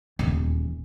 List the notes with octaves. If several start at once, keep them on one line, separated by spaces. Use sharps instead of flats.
D#1 E2